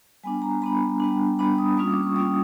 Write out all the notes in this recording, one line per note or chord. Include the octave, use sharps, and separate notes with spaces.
G3 B3 D4 G#5
A#5
G3 B3 D4 B5
G3 B3 D4
G3 B3 D4 B5
D#6
G3 A#3 C#4 F4 D#6
D6
C#6
G3 A#3 C#4 F4 D#6